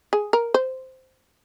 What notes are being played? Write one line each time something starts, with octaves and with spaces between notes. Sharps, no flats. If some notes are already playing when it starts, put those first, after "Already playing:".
G#4
A#4
C5